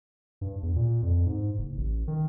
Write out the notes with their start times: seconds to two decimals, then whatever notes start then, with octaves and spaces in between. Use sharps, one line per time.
0.41 G2
0.63 E2
0.76 A#2
1.02 F2
1.26 G#2
1.58 F#1
1.77 A1
2.08 D#3